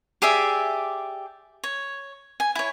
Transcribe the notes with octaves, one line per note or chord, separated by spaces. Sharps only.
G4 G#4 D5 E5
C#5
G#5
E4 C#5